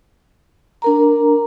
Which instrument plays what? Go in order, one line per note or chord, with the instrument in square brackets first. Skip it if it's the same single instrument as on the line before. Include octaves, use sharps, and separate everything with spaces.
[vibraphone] D4 A#4 A#5